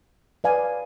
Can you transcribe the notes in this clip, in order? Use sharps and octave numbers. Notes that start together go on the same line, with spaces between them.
B4 D5 F5 G#5